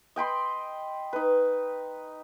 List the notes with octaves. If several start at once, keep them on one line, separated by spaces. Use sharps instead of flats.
D#5 G5 B5 C6
D#4 B4